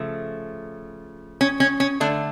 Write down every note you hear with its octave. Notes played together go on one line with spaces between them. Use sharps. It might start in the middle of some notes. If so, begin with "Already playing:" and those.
Already playing: C#3 F3 A3
C#4
C#4
C#4
D3 A3 D4